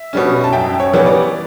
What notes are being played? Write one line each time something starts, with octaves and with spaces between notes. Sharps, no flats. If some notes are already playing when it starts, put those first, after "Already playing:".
Already playing: E5
B2 G3 C#4
A5
F#2 E5 G5
C#5
E3 G3 B3 C#5
D5